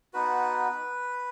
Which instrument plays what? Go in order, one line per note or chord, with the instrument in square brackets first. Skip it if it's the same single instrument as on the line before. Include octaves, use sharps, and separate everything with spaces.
[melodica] B3 D#4 F#4 B4